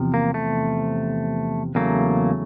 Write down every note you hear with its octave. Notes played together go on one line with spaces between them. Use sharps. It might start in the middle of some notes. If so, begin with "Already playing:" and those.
Already playing: E2 C3 F3
A#3
A3
E2 C#3 F#3 A3 A#3